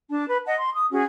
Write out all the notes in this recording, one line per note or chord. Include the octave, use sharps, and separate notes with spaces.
D4 A5
B4
D#5 F#5 A5
C6
D#6
C#4 F#4 G#4